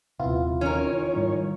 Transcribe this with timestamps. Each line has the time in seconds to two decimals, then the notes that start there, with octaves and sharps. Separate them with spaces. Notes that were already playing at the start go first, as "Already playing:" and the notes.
0.19 D#1 C3 B3 E4 F4
0.61 D#3 C#4 A#4 C#5
1.16 G#2 G3